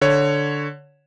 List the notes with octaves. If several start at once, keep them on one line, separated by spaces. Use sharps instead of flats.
D3 C#5